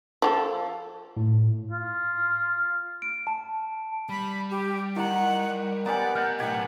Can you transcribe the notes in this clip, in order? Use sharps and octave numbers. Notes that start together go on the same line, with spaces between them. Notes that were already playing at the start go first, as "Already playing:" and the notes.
F3 G4 A4
A2
F4
D7
A5
G3 B5
G4
D#3 E4 F#5 A#5
B3 G4 A#4 D5 F#5 G#5 A#5
A3 D#5 F6 G6 A6
B1 A2 G4 F#5 G#5 G#6